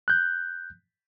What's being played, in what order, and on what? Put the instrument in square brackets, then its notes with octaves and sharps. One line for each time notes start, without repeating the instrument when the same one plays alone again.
[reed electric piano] F#6 G6